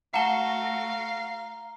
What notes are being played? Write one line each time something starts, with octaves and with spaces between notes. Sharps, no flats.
A3 F#4 F5 F#5 A5 A#5 G7